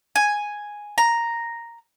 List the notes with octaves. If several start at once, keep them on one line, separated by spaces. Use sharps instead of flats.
G#5
A#5